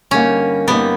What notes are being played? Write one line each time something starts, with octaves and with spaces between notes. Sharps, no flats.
G2 D3 G3 A#3 C#4 D#4
G2 D3 G3 A#3 B3 D#4